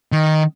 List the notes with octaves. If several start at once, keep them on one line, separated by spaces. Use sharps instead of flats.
D#3